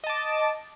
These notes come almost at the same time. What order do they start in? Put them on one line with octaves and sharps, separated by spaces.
D#5 A5 D6